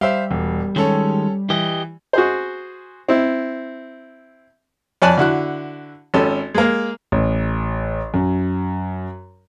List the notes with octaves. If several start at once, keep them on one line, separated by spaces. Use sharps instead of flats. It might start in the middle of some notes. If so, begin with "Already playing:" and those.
G3 C5 E5 F5
E1
D#3 G#3 C#4 A4 C#5
E3 G4 D#5
F#4 G#4 C5
C4 E4
F2 C#5 D5 G#5 A5 F#6
D3 E4 F#4 F#6
G#1 C#4 A4
G#3 A#3
A1
F#2